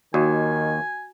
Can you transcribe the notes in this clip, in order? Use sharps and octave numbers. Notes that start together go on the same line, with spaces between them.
D#2 D#3 F#4 G#5